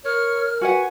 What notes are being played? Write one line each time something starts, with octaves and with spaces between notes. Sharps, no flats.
A#4 C#5 F6
F#4 B4 F#5 G#5